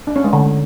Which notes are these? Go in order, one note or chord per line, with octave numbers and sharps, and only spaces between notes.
D4
C#4
G#3
D3